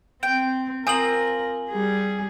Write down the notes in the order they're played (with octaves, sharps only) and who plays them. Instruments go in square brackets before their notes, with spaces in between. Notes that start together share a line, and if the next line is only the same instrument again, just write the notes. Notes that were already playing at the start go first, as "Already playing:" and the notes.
[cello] C4 [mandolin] G5
[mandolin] C4 F4 D#6 [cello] A#4 [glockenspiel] G#5 F#7
[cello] G3 G#4